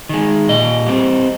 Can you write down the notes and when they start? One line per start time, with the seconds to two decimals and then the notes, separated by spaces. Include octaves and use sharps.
0.09 D#3 G#3
0.49 A#2 D#5
0.86 G3 C4